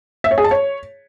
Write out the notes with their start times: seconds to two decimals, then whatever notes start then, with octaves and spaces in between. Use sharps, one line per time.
0.24 E5
0.31 C#5
0.38 G#4
0.44 A5
0.51 C#5